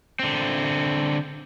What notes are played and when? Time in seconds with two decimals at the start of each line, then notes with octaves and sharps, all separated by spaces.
0.19 D3 C4